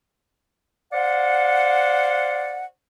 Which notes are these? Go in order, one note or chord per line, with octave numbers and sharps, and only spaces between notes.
C5 D5 F5 F#5